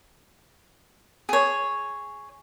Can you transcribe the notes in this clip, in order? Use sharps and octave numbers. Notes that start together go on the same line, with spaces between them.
G#4 C#5